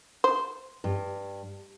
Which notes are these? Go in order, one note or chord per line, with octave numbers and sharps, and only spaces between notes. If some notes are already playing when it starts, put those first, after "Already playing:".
C5
G2